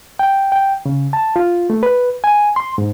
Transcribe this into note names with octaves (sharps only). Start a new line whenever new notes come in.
G5
G5
C#3
A5
F4
A3
B4
G#5
C6
G#2